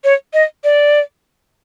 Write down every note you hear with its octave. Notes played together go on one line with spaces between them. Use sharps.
C#5
D#5
D5